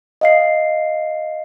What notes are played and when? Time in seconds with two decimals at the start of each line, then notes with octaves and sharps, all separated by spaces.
0.21 D#5 F5 C7